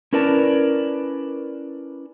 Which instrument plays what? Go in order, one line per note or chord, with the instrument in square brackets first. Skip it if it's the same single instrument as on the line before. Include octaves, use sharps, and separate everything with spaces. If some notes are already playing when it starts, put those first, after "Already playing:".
[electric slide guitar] C#4 E4 A#4 B4 D5 A5